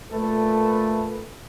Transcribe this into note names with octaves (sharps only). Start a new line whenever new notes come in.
A#2 A3 A4 B4